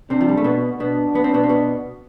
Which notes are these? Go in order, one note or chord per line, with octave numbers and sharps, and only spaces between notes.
C3 C4 D4
F3
G3
A3
B2 B3
B2 B3 D4
B3
C4
B2 B3
C4
B2 B3